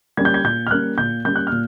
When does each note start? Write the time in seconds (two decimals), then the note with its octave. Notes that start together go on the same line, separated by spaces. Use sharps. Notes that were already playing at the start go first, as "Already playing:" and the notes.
0.17 G3 A#3 C#4 G#6
0.25 G6
0.34 G#6
0.44 A#2 G6
0.67 F6
0.71 G3 A#3 C#4 F#6
0.98 A#2 G6
1.25 G3 A#3 C#4 G6
1.36 F#6
1.47 A#2 F6